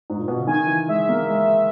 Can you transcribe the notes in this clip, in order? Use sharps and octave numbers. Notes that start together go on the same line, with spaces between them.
G#2
A#2
B2
C#3
D#3 G#5
E3
G#3 E5
A#3
G#3